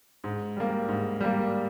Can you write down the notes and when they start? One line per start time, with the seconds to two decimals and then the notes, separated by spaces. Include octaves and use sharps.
0.24 G#2
0.57 G3 A#3
0.88 G#2
1.21 G3 A#3